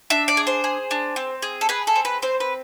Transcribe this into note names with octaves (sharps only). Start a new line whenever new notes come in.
D4 E5
D5
G#4
C5
G#4
D4
C4
G#4
A4
G#4 B4
A4
C4
B4
C4 C5
B4